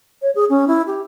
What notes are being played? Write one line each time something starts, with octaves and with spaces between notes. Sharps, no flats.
C#5
G#4
C#4
E4
G4